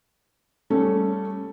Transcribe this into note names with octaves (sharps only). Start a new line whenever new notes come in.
G3 A3 C#4 A4